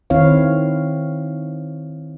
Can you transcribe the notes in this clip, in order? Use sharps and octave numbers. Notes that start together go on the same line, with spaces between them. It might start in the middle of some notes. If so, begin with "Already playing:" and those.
D#3 C4 E4 C#5 F5